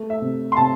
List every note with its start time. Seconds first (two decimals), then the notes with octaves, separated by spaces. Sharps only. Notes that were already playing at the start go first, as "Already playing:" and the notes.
Already playing: A3
0.10 E5
0.21 C3
0.52 C6
0.57 C3 A5